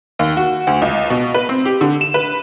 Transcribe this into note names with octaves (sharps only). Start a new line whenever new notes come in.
D#2
F#4
D2
C#2
B2
B4
C4
G4
D3
E7
B4